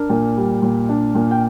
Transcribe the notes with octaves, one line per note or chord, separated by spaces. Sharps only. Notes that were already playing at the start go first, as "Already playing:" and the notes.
Already playing: D4 A#4
A#2
G3
A#2
D4
A#2
G5